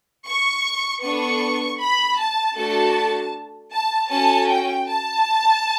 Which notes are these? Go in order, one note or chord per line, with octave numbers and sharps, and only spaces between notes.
C#6
B3 D4 A4 C#6
B5
A5
A3 D4 F#4 A4 A5
A5
C#4 F#4 A4 A5
G5
A5